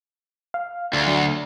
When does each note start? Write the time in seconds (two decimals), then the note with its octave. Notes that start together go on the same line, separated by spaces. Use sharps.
0.54 F5
0.93 D2
1.07 F#3 D4